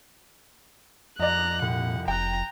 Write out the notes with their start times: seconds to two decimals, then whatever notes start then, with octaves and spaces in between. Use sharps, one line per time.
1.19 F2 D5 D#5 A#5 F#6
1.62 C2 A#2 F#5
2.08 F1 G5 A#5 F#6